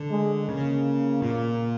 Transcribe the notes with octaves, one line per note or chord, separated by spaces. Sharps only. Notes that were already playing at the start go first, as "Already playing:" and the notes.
Already playing: D3
G#3
C#3 A#3
A#2